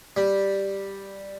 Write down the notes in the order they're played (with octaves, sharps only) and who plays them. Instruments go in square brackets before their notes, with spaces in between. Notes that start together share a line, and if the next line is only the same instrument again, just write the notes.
[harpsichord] G3